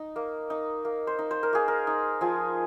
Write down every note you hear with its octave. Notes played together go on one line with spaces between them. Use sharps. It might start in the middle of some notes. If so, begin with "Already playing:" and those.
Already playing: D#4
A#3
D#4
A#3
C5
D#4
C5
A#4
A#3 G#4
A#4
D#4
F3 G#4